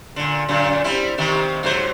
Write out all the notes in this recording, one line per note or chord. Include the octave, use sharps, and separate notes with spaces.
A#2 D3
F#2 A#2 D3
G3 C4 E4
C3 D#3 A#3
G#2 F#3 C5